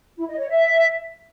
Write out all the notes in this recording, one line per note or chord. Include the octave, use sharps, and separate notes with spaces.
E4
D#5
C#5
E5